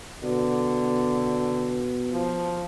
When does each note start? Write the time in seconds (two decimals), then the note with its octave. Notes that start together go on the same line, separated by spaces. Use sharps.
0.23 B2 D3
2.13 F3